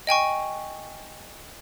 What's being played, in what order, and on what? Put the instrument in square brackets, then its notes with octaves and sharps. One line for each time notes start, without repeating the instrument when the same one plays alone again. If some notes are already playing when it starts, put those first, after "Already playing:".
[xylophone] D#5 G5 G#5 C#6